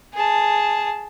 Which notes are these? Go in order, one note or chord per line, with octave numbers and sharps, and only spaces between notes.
G#4 A5